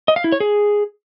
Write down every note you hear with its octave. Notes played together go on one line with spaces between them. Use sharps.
D#5
F5
E4
C#5
G#4